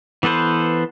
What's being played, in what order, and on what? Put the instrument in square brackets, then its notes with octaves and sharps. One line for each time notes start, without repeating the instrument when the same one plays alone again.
[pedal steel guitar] E3 B3 A4 B4 C5